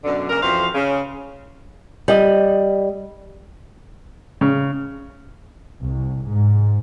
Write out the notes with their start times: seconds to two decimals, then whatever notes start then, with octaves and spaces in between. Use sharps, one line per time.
0.04 F#2 B2 D3
0.29 C#3 A#3 D4 A#4
0.42 F2 E3 F#4 C5 F5
0.73 C#3
2.08 G3 D#5
4.41 C#3
5.83 C2
6.28 G#2